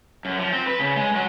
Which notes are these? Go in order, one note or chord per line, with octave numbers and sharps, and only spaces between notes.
F#2
F3
C4
B4
C#3
G#3
F#3